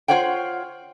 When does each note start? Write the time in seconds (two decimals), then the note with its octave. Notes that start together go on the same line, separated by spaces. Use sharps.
0.08 F4 C5 C#5 F#5 G5